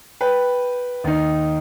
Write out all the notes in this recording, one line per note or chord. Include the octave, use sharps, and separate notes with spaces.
B4 G5
D#2 D#4